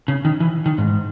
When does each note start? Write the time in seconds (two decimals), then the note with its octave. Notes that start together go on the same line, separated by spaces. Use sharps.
0.08 C#3
0.25 D#3
0.40 E3
0.66 D#3
0.78 G#2